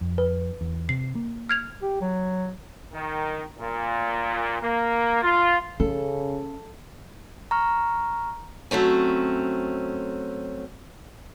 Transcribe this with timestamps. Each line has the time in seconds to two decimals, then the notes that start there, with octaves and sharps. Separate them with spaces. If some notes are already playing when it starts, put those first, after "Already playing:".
0.01 F2
0.18 B4
0.61 E2
0.89 C3 C7
1.15 A#3
1.49 F6 G#6 F7
1.82 G4
2.02 F#3
2.94 D#3
3.59 A#2
4.62 A#3
5.23 F4
5.80 C#3 C#4 A4
7.51 A#5 C#6 F6
8.71 F#3 A3 C4 C#4